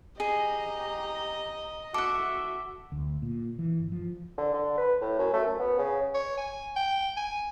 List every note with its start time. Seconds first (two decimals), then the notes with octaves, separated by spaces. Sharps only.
0.20 G4 G#4 D#5 A#5
1.94 F#4 A4 E5 F#5 D6
2.92 D2
3.22 A#2
3.59 E3
3.80 G1
3.92 F3
4.38 D3
4.54 D3
4.78 B4
5.01 A2
5.19 F#2
5.33 A3
5.46 F#2
5.60 B3
5.78 C#3
6.15 C#5
6.38 G#5
6.76 G5
7.17 G#5